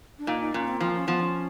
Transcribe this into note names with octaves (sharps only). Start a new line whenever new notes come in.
D4
A#2 D#4
D#4
A#2 C#4
C4
F3 C4
C#4
F3 B3
D4
C#4